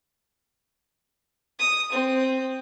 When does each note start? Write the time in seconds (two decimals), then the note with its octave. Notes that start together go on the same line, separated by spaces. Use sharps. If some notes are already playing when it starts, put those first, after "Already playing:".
1.59 D#6
1.92 C4